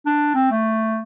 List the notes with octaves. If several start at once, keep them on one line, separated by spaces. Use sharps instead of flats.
D4
C4
A3